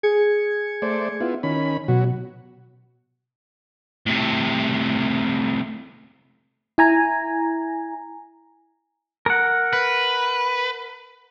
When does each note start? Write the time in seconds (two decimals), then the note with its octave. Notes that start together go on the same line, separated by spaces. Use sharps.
0.03 G#4 G#6 C#7
0.82 A3 C5 D5
1.21 B3 E4 F4
1.43 D#3 C#4 B5
1.88 B2 F#3 F#4
4.06 A2 C3
6.78 E4 G#5 A#5
9.26 A#4 F#5
9.73 B4